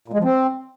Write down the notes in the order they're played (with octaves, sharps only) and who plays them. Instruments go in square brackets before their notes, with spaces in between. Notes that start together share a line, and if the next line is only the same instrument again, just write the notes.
[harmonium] A#2
G#3
F3
C4